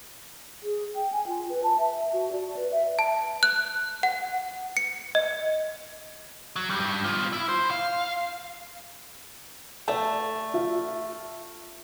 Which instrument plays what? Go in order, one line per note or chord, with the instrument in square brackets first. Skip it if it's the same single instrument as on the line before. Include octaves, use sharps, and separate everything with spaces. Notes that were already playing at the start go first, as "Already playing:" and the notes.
[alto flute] G#4
G5
G#5
F4
B4
A5
E5
F#4
D5
B4
E5
[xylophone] A5
F#6
F#5
C#7
D#5
[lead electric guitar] F#3
G2 G3
B2 F4
E4
C5
F5
[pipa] A3 A5 [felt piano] A4 D5
[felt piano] F4 E5